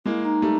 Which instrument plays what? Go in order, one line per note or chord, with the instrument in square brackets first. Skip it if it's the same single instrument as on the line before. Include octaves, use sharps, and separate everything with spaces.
[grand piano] G#3 A#3 [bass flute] E4
[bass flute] D#4
[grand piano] G3 A3